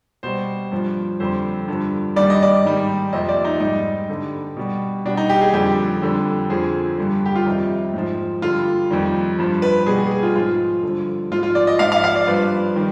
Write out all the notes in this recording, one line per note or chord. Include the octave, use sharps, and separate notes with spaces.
B2 G3 C5
G2 F3
F2 D3 G3 C5
G2 D3 F3
G2 D#3 G3 D5
D#5
D5
G#2 D#3 G3
F2 C3 F3 D#5
D5
D#4
G#2 G3 D#4
G2 D3 G3
B2 G3
B2 G3 D4
D#4
G4
G#4
F2 D3 G3 G4
F2 D3 G3
F2 D3 F3 G#4
G2 D3 G3
G4
F4
F2 C3 D#3 G3 D#4
G#2 F3
G2 D3 G3 F4
F2 D#3 G3
G2 F3
B4
B2 G3 G#4
G#4
G#4
F4
G#2 F3 F4
G2 D3 F3
G#2 F3 F4
F4
D5
D#5
G#2 F3 F5
F5
F5
D5
G2 F3 B4
D#3 G3